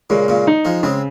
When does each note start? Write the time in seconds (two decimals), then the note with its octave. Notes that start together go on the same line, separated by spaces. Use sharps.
0.10 A#2 C#3 G#3
0.28 A#2 C#3
0.47 D#4
0.65 F3 G#3
0.83 C#3 G#3 C4